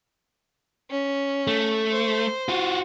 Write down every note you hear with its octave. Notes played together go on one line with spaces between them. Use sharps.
C#4
A3
C5
F4 F#4